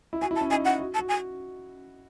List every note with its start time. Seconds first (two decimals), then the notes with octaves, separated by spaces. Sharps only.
0.13 E4
0.22 F#4 G#5
0.31 E4
0.36 A5
0.41 C#4
0.50 D#4 G#5
0.60 D#4
0.65 F#5
0.79 F#4
0.94 A5
0.99 F#4
1.09 G#5